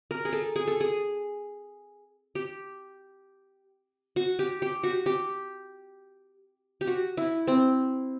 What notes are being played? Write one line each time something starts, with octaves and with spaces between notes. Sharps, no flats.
A#4
G#4
A4
G#4
A4
G#4
G4
F#4
G4
G4
F#4
G4
G4
F#4
E4
C4